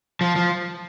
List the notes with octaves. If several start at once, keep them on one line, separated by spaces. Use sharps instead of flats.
F3
F3